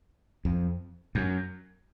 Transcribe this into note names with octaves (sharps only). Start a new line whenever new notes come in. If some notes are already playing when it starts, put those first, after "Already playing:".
F2
F#2